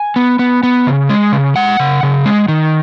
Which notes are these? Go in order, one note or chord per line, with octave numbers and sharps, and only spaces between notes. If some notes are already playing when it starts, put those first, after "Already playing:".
Already playing: G#5
B3
B3
B3
C#3
G#3
C#3
G#3 F#5
C#3
C#3
G#3
D#3